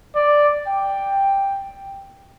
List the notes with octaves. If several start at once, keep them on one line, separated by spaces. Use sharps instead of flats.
D5
G5